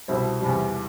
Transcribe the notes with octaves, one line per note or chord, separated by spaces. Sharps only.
C2 B2 G3 C4 E4
E2 C3 G3